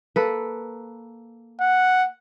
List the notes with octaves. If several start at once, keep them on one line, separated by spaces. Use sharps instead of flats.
A#3 A4 B4
F#5